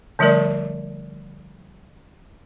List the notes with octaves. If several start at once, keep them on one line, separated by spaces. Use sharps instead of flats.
D3 F3 G3 A3 A#4 D5